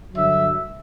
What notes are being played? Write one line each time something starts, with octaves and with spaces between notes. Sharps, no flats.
G2 D3 F#3 E5